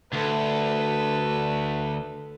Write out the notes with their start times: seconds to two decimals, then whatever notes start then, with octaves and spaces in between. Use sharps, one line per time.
0.13 D2 A4 B4